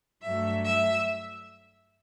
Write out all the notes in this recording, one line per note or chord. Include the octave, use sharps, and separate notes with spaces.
G2 F#3 A3 E5
E5